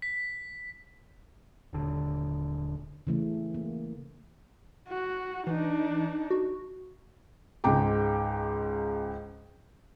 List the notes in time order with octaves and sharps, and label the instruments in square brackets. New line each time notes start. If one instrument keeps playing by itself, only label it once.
[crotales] B6
[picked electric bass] D#1 D3
[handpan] C#3 E3 A3
A#3
[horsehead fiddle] F#4
[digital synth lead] E3 [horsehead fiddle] D4 D#4
[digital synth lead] F#4
[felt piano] C#2 G#2 G5 A#5 D6